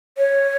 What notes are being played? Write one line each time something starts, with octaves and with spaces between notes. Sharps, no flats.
C#5